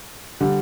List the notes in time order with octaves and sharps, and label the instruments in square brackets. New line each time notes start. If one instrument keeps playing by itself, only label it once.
[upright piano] D3 G3